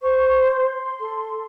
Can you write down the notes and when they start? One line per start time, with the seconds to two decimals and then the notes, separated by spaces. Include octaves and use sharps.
0.02 C5 C#6
0.40 C6
1.00 A4